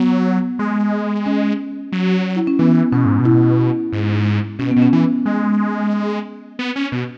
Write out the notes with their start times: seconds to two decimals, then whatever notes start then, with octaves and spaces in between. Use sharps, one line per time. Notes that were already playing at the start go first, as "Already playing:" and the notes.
Already playing: F#3 B3
0.59 G#3
1.26 C#4
1.92 F#3
2.36 E4
2.47 C#4
2.59 E3 B3
2.92 B2 C#4
3.05 G#2
3.19 B2
3.25 E4
3.93 G#2
4.59 B2 C#4
4.71 B3
4.76 B2
4.82 C#4
4.93 E3
5.26 G#3
6.59 B3
6.76 C#4
6.92 B2